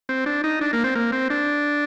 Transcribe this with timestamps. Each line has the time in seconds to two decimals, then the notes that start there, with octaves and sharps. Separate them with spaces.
0.09 C4
0.26 D4
0.44 D#4
0.61 D4
0.73 A#3
0.84 C4
0.95 A#3
1.12 C4
1.30 D4